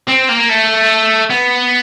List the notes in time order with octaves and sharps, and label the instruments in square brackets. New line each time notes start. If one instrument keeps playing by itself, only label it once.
[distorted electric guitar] C4
A#3
A3
B3